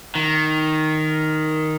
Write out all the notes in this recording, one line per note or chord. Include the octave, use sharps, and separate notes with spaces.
D#3